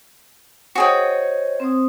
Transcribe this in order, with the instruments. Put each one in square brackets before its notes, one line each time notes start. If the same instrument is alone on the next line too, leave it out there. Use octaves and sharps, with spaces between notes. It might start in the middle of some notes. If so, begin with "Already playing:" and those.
[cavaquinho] F#4 G#4 G5 [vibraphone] C5 C#5 D#5
[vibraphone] C4 C5 D#6